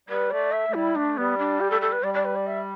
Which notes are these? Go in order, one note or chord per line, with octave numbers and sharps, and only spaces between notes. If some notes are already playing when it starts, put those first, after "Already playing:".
G3 B4
A3 D5
E5
A3
G3 E4
A3 D4
G3 B3
D4
G4
A4
A4
B4
G3 D5
D5
B4
D5
E5